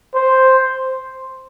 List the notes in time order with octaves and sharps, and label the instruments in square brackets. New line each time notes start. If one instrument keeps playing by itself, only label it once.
[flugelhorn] C5